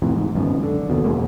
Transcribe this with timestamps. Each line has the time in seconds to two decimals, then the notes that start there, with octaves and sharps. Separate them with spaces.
0.02 F2 A2 C3 E3
0.16 G#2
0.35 G#1 C#2 F#2 B2
0.63 D3
0.90 F#1 D#2 B2
1.04 E2 B2 G#3 A#3